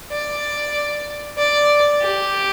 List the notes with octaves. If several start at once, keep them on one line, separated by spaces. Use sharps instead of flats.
D5
D5
G4